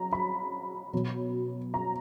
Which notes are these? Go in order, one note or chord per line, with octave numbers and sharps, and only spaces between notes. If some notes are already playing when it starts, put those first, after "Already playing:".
Already playing: F#3 A#5
B5
B2 F#3
A#5